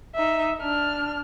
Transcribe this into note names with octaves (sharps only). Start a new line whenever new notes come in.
D#4 E5
D4 F6